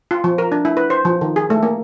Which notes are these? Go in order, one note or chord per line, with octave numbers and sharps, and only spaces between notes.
F4
F3
A#4
D4
E4
B4
C5
F3
D#3
G#4
A3
A#3